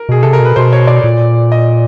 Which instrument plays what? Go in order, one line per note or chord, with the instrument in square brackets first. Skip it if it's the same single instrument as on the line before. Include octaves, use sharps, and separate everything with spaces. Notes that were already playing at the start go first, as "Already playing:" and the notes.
Already playing: [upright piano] A#4
[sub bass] B2 [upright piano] G#4
[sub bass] C3 [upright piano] A4
[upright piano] A#4
[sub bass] B2 [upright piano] B4
[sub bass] B2 [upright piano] C5
[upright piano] C#5
D5
[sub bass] A#2
[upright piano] D#5